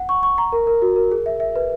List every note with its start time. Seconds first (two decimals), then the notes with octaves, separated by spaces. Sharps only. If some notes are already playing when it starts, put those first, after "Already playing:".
Already playing: F#5
0.09 C#6
0.23 C#6
0.38 A#5
0.52 A#4
0.67 A#4
0.82 F#4
0.96 A#4
1.12 G#4
1.26 E5
1.40 E5
1.55 B4